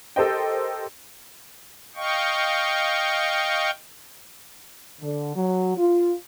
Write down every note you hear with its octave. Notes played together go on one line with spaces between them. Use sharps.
G4 A4 A#4 C5 D#5 G5
D#5 F5 G5 C#6
D3
F#3
F4